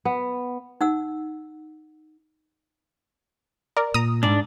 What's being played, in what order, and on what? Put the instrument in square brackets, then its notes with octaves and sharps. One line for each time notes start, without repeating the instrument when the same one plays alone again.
[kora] B3
[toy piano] D#4 F#5 E6
[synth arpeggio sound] A#4 D5
[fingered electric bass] A#2 [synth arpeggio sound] A#5 D#6
[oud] G#2 [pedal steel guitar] D4 D5